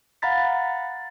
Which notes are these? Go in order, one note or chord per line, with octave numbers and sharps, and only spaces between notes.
F5 F#5 A#5 B5 A6 B6